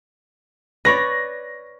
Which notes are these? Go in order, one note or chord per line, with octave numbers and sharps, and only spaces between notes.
B4 C#5 D5 A#6